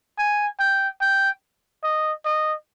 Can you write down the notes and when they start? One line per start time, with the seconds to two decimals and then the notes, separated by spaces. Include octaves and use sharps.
0.18 G#5
0.59 G5
1.01 G5
1.83 D#5
2.25 D#5